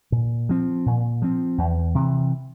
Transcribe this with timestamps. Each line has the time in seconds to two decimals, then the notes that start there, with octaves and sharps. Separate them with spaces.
0.12 A#2
0.49 F3 C4
0.86 A#2
1.22 F3 C4
1.58 E2
1.95 C3 E3